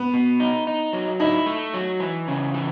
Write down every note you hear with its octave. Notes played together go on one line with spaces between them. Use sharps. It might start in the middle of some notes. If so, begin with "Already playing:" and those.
Already playing: B3
B2
D#4
D#4
F#3
D#4 E4
A3
F#3
E3
C#3
E3